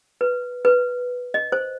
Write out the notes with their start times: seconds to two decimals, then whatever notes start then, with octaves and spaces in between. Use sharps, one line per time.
0.21 B4
0.65 B4
1.34 D#5
1.52 C5